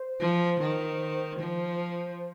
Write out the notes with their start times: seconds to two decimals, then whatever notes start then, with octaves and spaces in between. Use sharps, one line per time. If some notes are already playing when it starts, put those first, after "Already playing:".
Already playing: C5
0.20 F3
0.60 D#3
1.40 F3